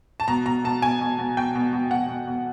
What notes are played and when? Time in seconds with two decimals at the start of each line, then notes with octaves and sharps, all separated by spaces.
0.20 A5
0.28 B2 A#5
0.46 B2 A#5
0.64 B2 A5
0.82 B2 G#5
1.01 B2
1.18 B2
1.37 B2 G5
1.55 B2
1.73 B2
1.91 B2 F#5
2.08 B2
2.27 B2